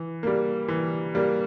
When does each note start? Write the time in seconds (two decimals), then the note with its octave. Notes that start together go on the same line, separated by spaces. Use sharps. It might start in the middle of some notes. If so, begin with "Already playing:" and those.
Already playing: E3
0.23 G3 A#3
0.68 E3
1.15 G3 A#3